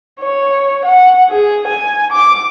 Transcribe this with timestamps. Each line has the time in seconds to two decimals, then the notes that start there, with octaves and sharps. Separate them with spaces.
0.20 C#5
0.85 F#5
1.30 G#4
1.68 G#5
2.12 D6